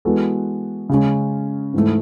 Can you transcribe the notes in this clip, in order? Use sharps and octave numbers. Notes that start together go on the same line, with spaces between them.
E3 G#3 B3 F#4 A4
C#3 G#3 C#4
G#2 E3 A3